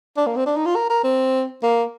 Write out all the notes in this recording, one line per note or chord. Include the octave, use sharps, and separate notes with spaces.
D4
A#3
C4
D4
D#4
F4
A#4
A#4
C4
A#3